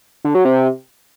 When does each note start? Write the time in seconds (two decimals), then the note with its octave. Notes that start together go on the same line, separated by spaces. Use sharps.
0.25 D3
0.35 F#3
0.45 C3